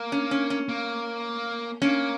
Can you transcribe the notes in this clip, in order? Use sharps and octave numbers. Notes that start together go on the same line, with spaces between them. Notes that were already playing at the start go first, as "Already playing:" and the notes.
Already playing: A#3
C#4
C#4
C#4
A#3
A#3 C#4